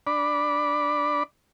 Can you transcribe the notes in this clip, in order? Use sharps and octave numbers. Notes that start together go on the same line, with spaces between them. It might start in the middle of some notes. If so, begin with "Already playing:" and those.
D4 D5 B5